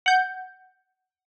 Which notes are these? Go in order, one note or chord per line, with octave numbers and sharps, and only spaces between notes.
F#5 G6